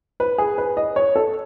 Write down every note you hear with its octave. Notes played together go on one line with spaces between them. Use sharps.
B4
G#4
B4
D#5
C#5
A4